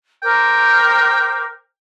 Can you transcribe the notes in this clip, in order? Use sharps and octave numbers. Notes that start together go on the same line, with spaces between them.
A#4 C5 G5 D6